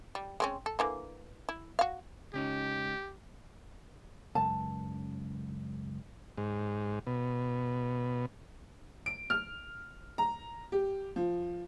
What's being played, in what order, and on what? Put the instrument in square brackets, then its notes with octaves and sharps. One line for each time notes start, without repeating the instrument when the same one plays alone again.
[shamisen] G3
G#3 C4 C#4
A4
D3 E3 A#3
E4
F#4 F5
[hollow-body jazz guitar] C#2 C#4 D#4 [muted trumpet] G4
[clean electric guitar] C#2 F#2 [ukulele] A5
[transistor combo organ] G#2
B2
[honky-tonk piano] D7
F6
A#5
G4
F3